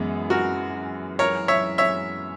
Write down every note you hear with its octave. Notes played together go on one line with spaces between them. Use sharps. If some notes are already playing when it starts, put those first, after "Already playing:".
Already playing: F#2 E3 G#3 B3
F#4 A#4
A#4 C#5
C#5 E5
C#5 E5